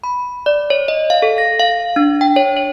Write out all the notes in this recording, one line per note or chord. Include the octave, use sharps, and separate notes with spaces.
B5
D5
C#5
D#5
F5
A4
A#6
F5
D4
G5
C#5
C#5